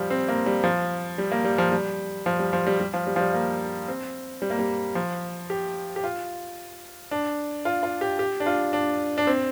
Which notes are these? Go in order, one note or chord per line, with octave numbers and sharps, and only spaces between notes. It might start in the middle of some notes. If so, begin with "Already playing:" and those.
Already playing: F3 G3
C4
A#3
G3
F3
G3
A#3
G3
F3
G3
F3
G3
F3
G3
G3
F3
G3
F3
G3
A#3
C4
G3
A#3
G3
F3
G4
G4
F4
D4
F4
F4
G4
G4
D4
F4
D4
D4
C4